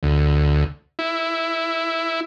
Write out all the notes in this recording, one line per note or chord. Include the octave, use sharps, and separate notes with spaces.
D2
E4